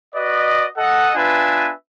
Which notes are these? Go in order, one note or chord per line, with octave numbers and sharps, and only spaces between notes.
F#4 B4 D5 D#5
A4 D#5 F#5
B3 D4 F4 B4 E5 G#5